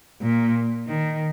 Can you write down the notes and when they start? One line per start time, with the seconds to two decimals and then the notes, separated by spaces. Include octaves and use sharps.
0.22 A#2
0.88 D#3